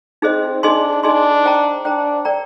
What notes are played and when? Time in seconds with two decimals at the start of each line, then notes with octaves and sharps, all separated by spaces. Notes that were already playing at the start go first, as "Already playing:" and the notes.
0.22 C4 D#4 G#4 C5 D#5
0.63 D4 D#4 G#4 D#5 G#5 C6
1.03 D4 D#4 G#4 D#5 G#5 C6
1.44 C5 G5 A#5
1.85 D4 C5 G5 A#5
2.25 A#4 D5 G5 A#5